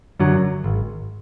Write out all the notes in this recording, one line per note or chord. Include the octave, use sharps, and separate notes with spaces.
F#2 D3 F#3
G#1